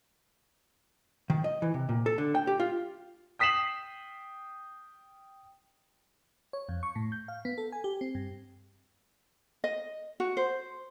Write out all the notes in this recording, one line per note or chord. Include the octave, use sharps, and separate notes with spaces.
D#3
D#5
E3
C3
A#2
A4
D3
G5
G4
F4
G5 D#6 B6 C7 E7 F#7
C#5
F2
C#6
A2
G6
F5
B3
A4
G#5
G4
C4
G2
D#5
F#4
C5